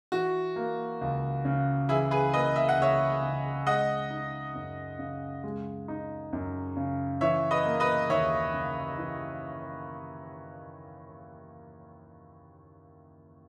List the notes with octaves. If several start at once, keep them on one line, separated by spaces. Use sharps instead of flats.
E3 F#4
A#3
C#2
C#3
E3 E4 G#4
G#4 B4
A#3 B4 D#5
E5
F#5
C#2 C#5 E5
C#3
G#3 D#5 F#5
D#4
F#2
C#3
G#3
D#4
F#2
C#3
E3 C#5 E5
B4 D#5
A#3
B4 D#5
D#2 C#5 E5
C#3
E3